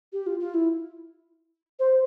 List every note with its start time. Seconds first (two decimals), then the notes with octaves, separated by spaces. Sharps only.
0.13 G4
0.26 F4
0.40 F4
0.54 E4
1.80 C5